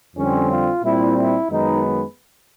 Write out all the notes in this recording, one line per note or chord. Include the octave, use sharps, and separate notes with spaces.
F2 D3 G3 C4 C#4
F4
A#2 G3 C4 E4
E4
F#2 D#3 G#3 B3 D#4